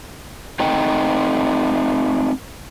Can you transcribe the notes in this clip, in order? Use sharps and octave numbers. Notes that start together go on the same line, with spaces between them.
A3 C4 D#4 D#5 G5